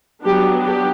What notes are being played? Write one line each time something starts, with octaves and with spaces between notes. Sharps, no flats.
F#3 B3 D4 G4
G4